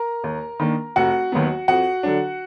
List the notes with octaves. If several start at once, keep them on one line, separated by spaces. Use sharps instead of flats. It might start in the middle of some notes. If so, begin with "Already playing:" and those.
Already playing: A#4 A#5
D#2
D#3 A#3 D4
F1 F#4 F#5
D#2 D#3 F#3 B3
F2 F#4 F#5
D3 F#3 D4